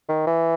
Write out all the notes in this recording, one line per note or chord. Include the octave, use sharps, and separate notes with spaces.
D#3
E3